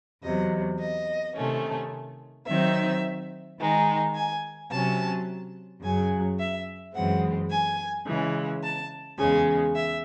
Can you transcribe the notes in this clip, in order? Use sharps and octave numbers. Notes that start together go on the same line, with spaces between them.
E2 C3 F#3 D#5
D#5
C3 D#3 A3 C#4
D#3 F#3 C4 D#4 E5
D#3 G#3 D#4
G#5
C3 F#3 C#4 A5
F#2 C#3 F#3 G#5
E5
F#2 E3 G#3 C4 F#5
G#5
C#3 E3 G#3
A5
E2 C#3 G#3 G#5
E5